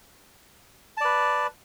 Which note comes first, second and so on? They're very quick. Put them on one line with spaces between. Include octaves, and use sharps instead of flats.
A5 D5 B4